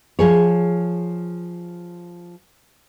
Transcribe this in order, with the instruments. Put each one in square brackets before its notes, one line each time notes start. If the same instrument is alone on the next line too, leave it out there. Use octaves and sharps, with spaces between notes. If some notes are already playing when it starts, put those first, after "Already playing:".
[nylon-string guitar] F3 G#4 C#5